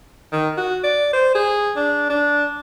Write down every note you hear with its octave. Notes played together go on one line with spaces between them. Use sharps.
D#3
F#4
D5
C5
G#4
D4
D4